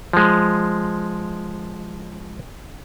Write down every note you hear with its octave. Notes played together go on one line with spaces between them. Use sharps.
F3 G#3